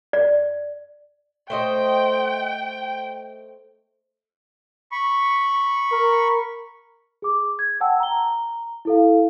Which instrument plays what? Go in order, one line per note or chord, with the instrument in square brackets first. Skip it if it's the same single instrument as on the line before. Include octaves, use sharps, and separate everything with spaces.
[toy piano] D5
[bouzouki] A3 C5 D#5 [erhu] G5
[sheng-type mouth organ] B5 C#6
[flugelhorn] A#4
[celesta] G#4 D6
G#6
F#5 G5 A5 E6
A#5 G7
E4 A4 F5